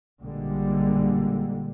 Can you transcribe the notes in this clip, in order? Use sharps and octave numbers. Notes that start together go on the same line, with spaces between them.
A#1 D3 G3 G#3 A#3